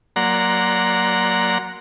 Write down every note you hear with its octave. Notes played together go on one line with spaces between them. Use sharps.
F#3 A#3 D5 F#5 A#5 C6